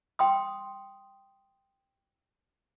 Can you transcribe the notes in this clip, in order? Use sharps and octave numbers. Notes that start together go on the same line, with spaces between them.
G5 C6 D#6